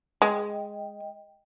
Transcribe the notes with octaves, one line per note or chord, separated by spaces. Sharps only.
G#3 D#5 G5